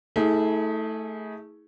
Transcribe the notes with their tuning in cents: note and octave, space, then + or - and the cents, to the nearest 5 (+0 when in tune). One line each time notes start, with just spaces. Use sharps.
A3 +0 E4 -45 G#4 +0